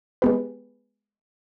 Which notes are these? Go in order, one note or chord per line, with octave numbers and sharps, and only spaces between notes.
G#3 B3 G4 B4